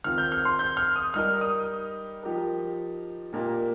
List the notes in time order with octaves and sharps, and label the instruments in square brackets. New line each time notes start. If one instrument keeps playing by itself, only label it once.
[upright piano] D#3 C4 F4 A#4 [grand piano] F6
[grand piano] G6
F6
C6
G6
F6
D#6
[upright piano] G3 D#4 A#4 [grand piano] F6
[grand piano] D#6
[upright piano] F3 D#4 G4 A#4
A#2 A#3 D#4 G4 A#4